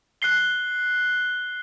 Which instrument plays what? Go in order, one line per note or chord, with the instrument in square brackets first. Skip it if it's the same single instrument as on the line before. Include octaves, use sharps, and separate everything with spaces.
[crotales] F#6 C7 G7